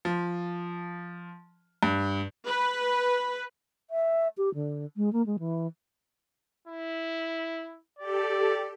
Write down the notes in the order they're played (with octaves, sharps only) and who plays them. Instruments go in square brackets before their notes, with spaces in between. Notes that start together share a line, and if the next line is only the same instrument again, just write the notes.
[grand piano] F3
G2
[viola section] B4
[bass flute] E5
G4
D3
G#3
A#3
G#3
E3
[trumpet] E4
[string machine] G4 A4 [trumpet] D5